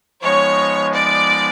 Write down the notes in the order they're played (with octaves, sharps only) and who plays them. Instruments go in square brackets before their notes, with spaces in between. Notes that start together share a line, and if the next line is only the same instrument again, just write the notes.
[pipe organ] F3 G#3 B3 D#4 [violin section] C#5
[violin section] D5